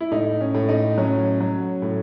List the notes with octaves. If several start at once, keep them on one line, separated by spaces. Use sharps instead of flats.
E4
A2 D#4
C#4
A2
D#4
F#3 C#4
F#3
A2